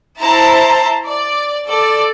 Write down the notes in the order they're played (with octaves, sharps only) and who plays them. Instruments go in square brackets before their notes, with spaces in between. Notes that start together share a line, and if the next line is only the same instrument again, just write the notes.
[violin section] E4 C5 A5 A#5
D5
A4 D5